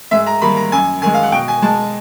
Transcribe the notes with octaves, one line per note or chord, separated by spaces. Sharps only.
G#2 E5
A#5
D#3 G3 A#3 B5
A#5
F#2 G#5
D#3 G#3 G#5
F5
F#5
B2 G5
G#5
G#3 A5